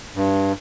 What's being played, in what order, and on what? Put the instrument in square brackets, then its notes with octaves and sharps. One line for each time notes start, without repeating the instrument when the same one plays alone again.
[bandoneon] G2